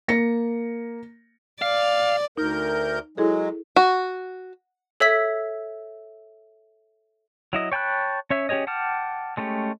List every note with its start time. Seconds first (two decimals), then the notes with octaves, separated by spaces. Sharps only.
0.08 A#3 A#6 C#7
1.62 D5 F5
2.37 D2 D#4 A#4 G6
3.17 F#3 G#3 E4 G#4 A4
3.76 F#4
5.00 A4 C#5 E5 E6 B6
7.53 F#3 E4 D#5
7.72 C#5 G5 A5 B5 F#6
8.30 C#4 C#5 E5
8.49 C#4 G4 G#4 C#5 D#5
8.67 F#5 G5 A5 D6 F6
9.37 G#3 A3 C#4 G4